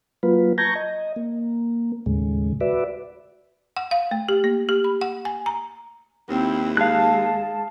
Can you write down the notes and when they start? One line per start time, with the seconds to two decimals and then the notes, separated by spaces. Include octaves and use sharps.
0.23 F#3 A#3 F4 B4
0.58 A5 A#5 C#6 G6 G#6 A#6
0.75 D#5
1.16 A#3
2.06 D#2 A2 C#3 G#3
2.61 F#4 B4 D5 E5
3.77 F#5
3.91 F5
4.11 A3
4.29 G4
4.44 A#3
4.69 G4
4.84 B5
5.01 F#5
5.25 G#5
5.46 A#5
6.29 D#2 C4 E4
6.77 G#3 F5 A5 F#6